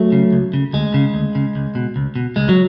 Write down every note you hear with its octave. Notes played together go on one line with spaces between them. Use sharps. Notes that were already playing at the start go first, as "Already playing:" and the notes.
Already playing: F#3 A3
C#3
C#2
C#3
D2 G#3
C#3
D2
C#3
C#2
B2
C#2
B2
C#2 G#3
F#3